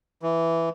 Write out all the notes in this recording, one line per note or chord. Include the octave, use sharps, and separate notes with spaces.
E3